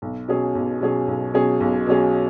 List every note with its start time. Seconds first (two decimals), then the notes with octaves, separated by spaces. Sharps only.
0.02 B1
0.28 B2 F#3 C#4 G#4
0.55 B1
0.81 B2 F#3 C#4 G#4
1.07 B1
1.34 B2 F#3 C#4 G#4
1.60 B1
1.87 B2 F#3 C#4 G#4